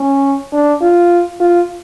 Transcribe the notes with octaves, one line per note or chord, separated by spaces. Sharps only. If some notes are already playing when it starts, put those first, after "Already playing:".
Already playing: C#4
D4
F4
F4